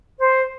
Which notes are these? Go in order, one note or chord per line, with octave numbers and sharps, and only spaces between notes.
C5